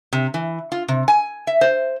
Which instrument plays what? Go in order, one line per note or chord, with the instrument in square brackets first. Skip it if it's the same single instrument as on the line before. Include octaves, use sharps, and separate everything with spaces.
[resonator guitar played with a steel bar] C3
E3
F4
C3
G#5
E5
C5